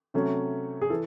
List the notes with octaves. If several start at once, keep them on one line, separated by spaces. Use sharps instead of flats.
C3 F#3 A3 C#4
G#4
E3 A4